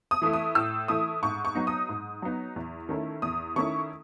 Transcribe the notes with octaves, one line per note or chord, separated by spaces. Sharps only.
D#6
E3 A3 E4
D#6
A2 E6
E3 A3 E4 D#6
G#2 C#6
C#6
F#3 B3 D#4
D#6
G#2
F#3 B3 D#4
E2
D#3 A3 C#4 E4
E2 D#6
D#3 A3 C#4 E4 C#6